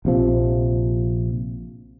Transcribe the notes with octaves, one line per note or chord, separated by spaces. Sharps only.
A#1 C3 F3